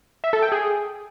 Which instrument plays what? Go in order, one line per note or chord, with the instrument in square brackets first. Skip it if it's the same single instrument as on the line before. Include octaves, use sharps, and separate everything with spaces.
[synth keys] E5
A4
G5
G#4